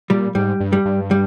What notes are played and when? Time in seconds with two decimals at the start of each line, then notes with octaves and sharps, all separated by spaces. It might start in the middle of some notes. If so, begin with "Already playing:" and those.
0.10 A#2 G3
0.35 G#2 G3
0.60 G2
0.73 G3
0.85 G2
1.11 G3